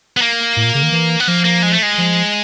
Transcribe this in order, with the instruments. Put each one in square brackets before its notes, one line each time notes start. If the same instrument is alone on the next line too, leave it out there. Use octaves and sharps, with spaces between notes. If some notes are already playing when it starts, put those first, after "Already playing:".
[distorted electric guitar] B3
A#3
[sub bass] A2
A#2
C#3
D#3
E3
[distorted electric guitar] B3
[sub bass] F3 [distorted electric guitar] A#3
[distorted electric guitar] A#3
G#3
A3
G#3
[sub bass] F3